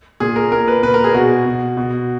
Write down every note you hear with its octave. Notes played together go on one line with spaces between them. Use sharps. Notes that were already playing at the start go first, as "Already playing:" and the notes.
A#2 G#4
A#4
A#2 A#4
B4
A#2 B4
A#4
G#4
B2 F#4
B2
B2